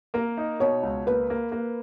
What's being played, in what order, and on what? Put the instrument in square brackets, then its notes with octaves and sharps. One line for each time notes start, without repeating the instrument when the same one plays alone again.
[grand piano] A#3 [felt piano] A#4
[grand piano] D#4
[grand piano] B2 [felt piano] C#5
[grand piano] C#2
[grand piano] A#3 [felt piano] B4
[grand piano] A#3
A#3